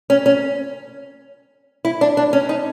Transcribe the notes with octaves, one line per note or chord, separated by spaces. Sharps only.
C#4
C#4
E4
D4
D4
C#4
D#4